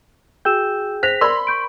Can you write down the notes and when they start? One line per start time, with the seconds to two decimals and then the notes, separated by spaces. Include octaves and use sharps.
0.45 F#4 G#4 G5 E6 G6 E7
1.03 C5 A#6 B6 F7
1.21 A#4 D5 B5 C6
1.47 C#6 G6 D7